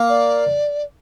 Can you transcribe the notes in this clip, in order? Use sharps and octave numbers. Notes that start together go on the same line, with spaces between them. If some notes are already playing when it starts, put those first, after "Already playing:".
Already playing: A#3
D5